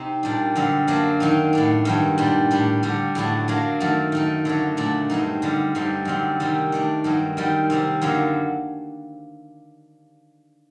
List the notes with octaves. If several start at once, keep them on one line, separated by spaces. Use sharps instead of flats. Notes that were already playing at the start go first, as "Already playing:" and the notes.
Already playing: C3 C4 D#4
A#2 G3 D4
F#2 D3 G3 C4
F#2 F#3 A#3 D4
D#3 F#3 C4 D#4
A2 A3 D4
G2 D#3 F#3
A#2 G3 D4
A2 G3 D4
D3 G3 D4
A2 F#3 A3 D4
F#2 F#3 A#3 D4
F#2 D#3 A3
D#3 A3 D#4
D3 F#3 A3
A#2 A3 D4
G2 F#3 C4 D#4
F#2 D3 G3
G2 D3 G3 C4 D#4
F#2 D3 G3 C4
C3 D#3 G3
D#3 A3 D4
G2 D#3 F#3
F#2 D#3 G3
C3 D#3 G3 C4
F#2 D3 F#3 A#3